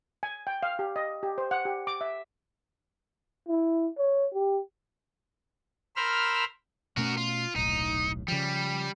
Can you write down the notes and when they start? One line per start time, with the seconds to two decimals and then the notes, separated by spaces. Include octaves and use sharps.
0.23 G#5
0.47 G5
0.63 F5
0.79 G4
0.96 D#5
1.23 G4
1.38 C5
1.51 F#5
1.65 G4
1.87 D6
2.01 E5
3.48 E4
3.97 C#5
4.34 G4
5.96 A#4 C5 B5 E6 F6
6.97 B2 A3 C#4 F#4 A#4
7.17 F4
7.56 D#1 B1 A2 D#4
8.28 C#3 F3 G3